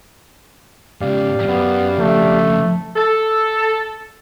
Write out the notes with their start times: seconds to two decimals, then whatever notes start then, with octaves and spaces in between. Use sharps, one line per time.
1.01 G#2 C#3 G4 D5 F5
1.48 F#2 B3
1.99 F2 C#3 A3
2.96 A4